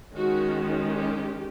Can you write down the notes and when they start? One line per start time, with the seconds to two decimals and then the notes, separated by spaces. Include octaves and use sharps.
0.14 D#3 G#3 C#4 F#4
0.88 G4